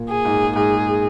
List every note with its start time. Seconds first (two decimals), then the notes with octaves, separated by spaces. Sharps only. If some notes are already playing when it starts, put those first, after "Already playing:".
Already playing: A#2
0.09 G#4
0.25 G#2
0.56 G#2 G#4